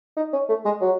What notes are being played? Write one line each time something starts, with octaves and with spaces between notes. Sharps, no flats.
D#4
C#4
A3
G#3
F#3